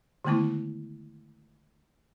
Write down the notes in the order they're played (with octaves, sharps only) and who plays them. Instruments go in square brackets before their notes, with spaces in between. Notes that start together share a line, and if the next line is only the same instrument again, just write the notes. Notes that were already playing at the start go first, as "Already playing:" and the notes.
[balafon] D3 D#3 G#3 A3 B3 E4